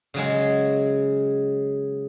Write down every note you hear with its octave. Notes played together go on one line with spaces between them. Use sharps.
C#3 F#3 G#3